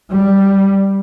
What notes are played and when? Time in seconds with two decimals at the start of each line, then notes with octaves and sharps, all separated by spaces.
0.11 G3